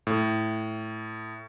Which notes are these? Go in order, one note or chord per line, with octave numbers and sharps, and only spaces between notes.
A2